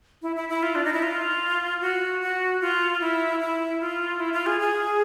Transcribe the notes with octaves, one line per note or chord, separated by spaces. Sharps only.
E4
E4
E4
F4
D4
D#4
E4
F4
F#4
F#4
F4
E4
E4
F4
E4
F4
G#4
G#4